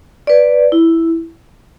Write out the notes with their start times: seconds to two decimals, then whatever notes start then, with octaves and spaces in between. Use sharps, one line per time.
0.27 B4 D5
0.72 E4